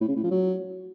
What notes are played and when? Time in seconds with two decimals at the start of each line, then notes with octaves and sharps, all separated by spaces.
0.01 A2
0.08 C#3
0.16 A2
0.24 F3
0.31 F#3